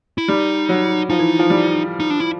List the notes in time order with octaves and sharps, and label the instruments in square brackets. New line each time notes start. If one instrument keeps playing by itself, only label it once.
[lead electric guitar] E4
[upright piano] G3 [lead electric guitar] D#4
[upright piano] F#3
[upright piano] F3 [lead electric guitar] D#4
[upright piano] E3
F3
G3
[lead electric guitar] D#4
D4
E4